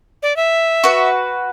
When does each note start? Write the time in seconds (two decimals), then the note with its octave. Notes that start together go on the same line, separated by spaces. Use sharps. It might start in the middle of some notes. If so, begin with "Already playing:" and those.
0.23 D5
0.37 E5
0.84 F#4 B4